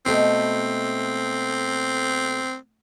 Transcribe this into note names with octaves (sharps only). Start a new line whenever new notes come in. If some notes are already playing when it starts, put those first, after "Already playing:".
B2 G#3 A3 C4 E4 D#5